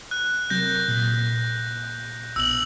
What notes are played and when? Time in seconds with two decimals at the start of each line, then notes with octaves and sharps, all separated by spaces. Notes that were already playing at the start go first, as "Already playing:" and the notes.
0.11 F#6
0.50 C3 F#3 A#4 G6 A#6
0.88 A#2 B6
2.36 A#1 B2 E6 F#7